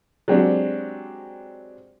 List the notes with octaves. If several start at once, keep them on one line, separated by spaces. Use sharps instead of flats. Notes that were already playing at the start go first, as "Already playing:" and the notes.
F#3 G#3 C4 D4 F#4 G4